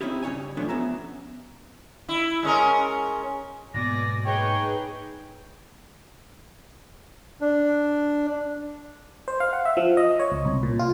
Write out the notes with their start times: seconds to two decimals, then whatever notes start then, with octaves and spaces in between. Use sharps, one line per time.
0.01 C4 C#4 D#4 E4 G4
0.23 G2 C#3 C#4 C#5 G#5
0.57 F3 G3 A3 B3 C#4 D4
0.69 B3 C#4 E5 A#5
2.09 E4
2.43 G#3 C#4 A#4
3.74 G#2 B2 A#3 D5 G#5 A#6
4.25 D#4 G#4 B4 C#5 G5
7.41 D4
9.28 C5
9.40 F5
9.53 F#5
9.65 E5
9.77 F3
9.97 D#5
10.20 C#5
10.32 C#2
10.45 C2
10.63 A#2
10.79 F4